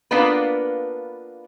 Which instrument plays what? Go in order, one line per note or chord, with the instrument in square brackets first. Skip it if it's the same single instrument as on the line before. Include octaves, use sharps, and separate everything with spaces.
[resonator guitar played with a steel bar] A#3 B3 D4 F4 B4